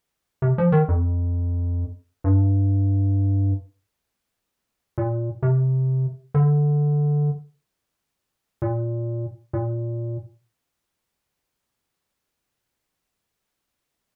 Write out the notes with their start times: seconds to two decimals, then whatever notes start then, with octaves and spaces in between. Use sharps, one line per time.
0.42 C3
0.58 F3
0.72 D#3
0.89 F2
2.24 G2
4.98 A#2
5.43 C3
6.35 D3
8.62 A#2
9.53 A#2